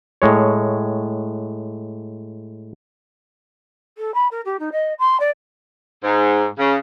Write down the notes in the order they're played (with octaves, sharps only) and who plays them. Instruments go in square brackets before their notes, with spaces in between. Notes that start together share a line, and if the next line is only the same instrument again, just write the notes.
[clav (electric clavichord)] A2 G#3 C#5
[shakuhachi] A4
B5
A#4
G4
D#4
D#5
C6
D5
[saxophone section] G#2
C#3